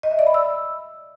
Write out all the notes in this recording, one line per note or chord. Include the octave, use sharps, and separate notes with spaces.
D#5
E5
D5
B5
E6